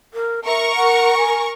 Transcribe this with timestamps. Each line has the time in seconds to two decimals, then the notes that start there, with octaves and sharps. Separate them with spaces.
0.14 A#4
0.46 A#4 E5 C#6
0.75 F#5
1.17 G#5